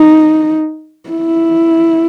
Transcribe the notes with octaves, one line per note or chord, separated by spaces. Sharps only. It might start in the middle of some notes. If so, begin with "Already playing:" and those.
Already playing: D#4
E4